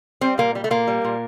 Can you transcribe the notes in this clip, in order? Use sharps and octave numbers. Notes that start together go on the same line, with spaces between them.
G3 C4
A#2 A#3
G3
A3
A#2 A#3
G3
A#2